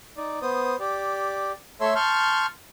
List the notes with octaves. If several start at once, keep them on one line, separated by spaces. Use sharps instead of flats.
D#4 D5
B3 C5 D#6
G4 D5
A3 A4 C#5 E5 C6 E6
A5 C6 C#6 F6 G6